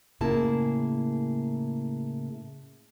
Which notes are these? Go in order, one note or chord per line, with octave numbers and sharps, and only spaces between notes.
A2 C#3 A#3 E4 G#4 A5